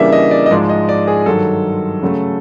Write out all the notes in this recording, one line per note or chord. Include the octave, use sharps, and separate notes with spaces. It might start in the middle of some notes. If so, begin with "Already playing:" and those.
Already playing: C#3 E3 G3 A#3 D4 E5
D#5
D5
D#5
G#2 F3 G#3 D5
D#5
D5
G#4
G2 D#3 F#3 A4
C#3 F#3 A3